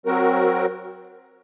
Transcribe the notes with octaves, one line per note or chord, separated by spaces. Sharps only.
F#3 C4 F#4 A#4